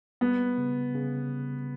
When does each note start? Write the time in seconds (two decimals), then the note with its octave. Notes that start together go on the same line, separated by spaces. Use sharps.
0.21 G3 B3
0.58 C#3
0.95 C#3